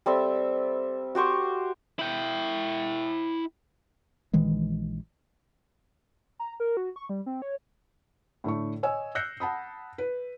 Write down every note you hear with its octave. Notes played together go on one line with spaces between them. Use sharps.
G3 C4 A4 E5
F#4 G4 C5 C#6
E4 G5
A#1 D#3 E3 G#3
A#5
A#4
F#4
C#6
G3
C4
C#5
A2 D3 A3 C#6
C#5 D#5 G#5 E6
E6 F#6 G6 A#6 C7 C#7
F#5 A5 B5 D#6
B4